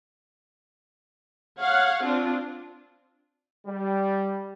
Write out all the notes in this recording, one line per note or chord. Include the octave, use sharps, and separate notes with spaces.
C#5 F5 F#5
C4 D4 F4
G3